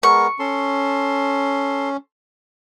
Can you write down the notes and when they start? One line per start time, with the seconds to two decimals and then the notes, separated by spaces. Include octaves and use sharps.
0.03 G#3 B3 A#4 C#6
0.39 C#4 A4 C6